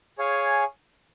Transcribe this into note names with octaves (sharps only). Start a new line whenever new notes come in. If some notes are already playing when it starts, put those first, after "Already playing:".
G#4 C#5 F5 G#5